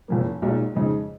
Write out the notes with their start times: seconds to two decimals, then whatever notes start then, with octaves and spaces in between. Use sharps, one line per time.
0.08 F#1 F2 F3 A#3
0.42 B1 A#2 G#3 D#4 F#4
0.75 F2 C#3 G#3 D#4